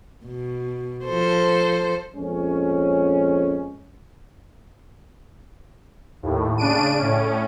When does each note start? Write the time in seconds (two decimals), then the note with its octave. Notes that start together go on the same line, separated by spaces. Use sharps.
0.25 B2
1.05 F3 A4 C5
2.16 F2 A#2 G#3 C#4
6.23 D#2 A2
6.58 C#3 D4 D7 D#7
6.99 A2 C#4